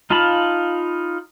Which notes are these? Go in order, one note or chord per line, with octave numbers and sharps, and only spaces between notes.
D#4 F4 F5 A5 B5